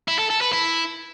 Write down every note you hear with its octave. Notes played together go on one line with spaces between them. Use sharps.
E4
A4
A4
B4
E4